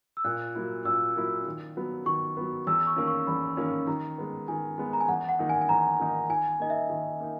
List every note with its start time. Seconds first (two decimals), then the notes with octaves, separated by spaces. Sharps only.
0.17 E6
0.24 A#2 F#6
0.55 F#3 A#3 E4
0.85 A#2 E6
1.16 F#3 A#3 E4
1.46 D#3
1.77 F#3 B3
2.06 D#3 C#6
2.37 F#3 B3
2.67 E2 E6
2.87 C#6
2.96 D#3 A#3 C#4
3.07 C#6
3.27 E2 B5
3.57 D#3 A#3 C#4
3.87 D#3 A#5
4.18 G#3 B3
4.48 D#3 G#5
4.78 G#3 B3
4.93 A#5
5.01 G#5
5.08 E2 F#5
5.29 F#5
5.39 D#3 A#3 D#4
5.49 G#5
5.61 G#5
5.69 E2 A#5
5.99 D#3 A#3 D#4
6.30 D#3 G#5
6.60 A#3 D#4 D#5
6.70 E5
6.90 D#3
7.20 A#3 D#4